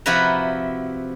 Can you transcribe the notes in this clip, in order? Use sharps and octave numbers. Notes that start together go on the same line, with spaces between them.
C3 F3 E4 F#4 B4 A#5